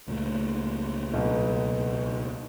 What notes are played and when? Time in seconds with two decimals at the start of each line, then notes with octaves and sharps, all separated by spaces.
0.08 C#2 A#2 A3
1.14 B1 B3